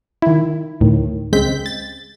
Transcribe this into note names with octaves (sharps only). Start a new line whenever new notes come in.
D#3 E4
D2 A2 D#3
C#2 C#3 G#3 C4 G6 B6
A6